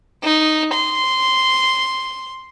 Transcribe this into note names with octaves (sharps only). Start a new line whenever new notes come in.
D#4
C6